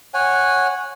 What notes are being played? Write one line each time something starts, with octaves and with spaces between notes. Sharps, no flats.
C#5 F#5 G#5